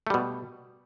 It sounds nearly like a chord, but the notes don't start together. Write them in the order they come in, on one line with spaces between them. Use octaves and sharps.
A3 G3 B2